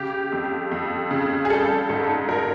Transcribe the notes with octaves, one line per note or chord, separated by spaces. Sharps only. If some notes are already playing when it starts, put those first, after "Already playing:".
Already playing: C#3 G4
F2
F2
C#3
G#4
G3 A4
G#2 A4
G#2 A#4